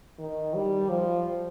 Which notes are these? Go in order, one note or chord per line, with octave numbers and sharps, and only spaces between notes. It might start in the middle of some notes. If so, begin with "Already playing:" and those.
D#3
G3
F3